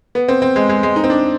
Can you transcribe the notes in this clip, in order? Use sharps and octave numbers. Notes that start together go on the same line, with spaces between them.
B3
C4
C4
G#3
G#3
G#3
D#4
C4
D4